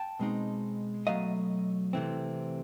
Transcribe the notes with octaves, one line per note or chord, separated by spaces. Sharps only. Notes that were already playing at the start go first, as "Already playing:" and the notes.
Already playing: G5 A5
B2 G#3 C4 D#4
B2 F#3 A3 D#5 F5
C3 E3 A3 C4